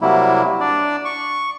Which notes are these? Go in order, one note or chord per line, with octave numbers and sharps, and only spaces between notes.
C3 F#3 G3 A#3 E4
D4 D5
C#6